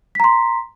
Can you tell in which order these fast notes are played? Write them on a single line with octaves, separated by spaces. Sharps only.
B6 A#5 C6